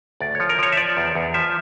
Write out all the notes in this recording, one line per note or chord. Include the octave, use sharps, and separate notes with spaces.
D2 D5
F3 C#5
A#4
F3 C#5
E5
F3 D5
E2
E2
F3 E5